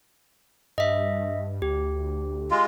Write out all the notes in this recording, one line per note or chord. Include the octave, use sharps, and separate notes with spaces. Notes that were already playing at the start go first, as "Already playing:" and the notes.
G2 D#5 E5
D2 G4
G#3 F4